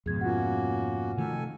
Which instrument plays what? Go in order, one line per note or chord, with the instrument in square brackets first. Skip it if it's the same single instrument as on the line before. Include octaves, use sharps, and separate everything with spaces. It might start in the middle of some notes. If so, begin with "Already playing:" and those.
[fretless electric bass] F2 G#2 B2 [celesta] G#4 G#6
[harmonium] A#3 C#4 F#4 [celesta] F4 F#5
[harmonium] F2 A4 G#5 [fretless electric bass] C3 D#3 A3